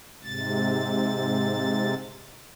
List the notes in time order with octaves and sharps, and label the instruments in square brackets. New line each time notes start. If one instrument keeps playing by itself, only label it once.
[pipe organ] G#2 C3 A6